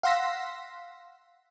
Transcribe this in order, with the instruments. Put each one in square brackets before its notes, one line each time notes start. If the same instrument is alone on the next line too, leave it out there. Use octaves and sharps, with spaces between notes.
[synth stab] F5 F#5 C6 E6 A#6 B6